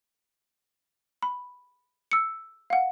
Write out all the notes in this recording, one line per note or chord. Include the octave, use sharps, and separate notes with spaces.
B5
E6 C#7
F5 F#5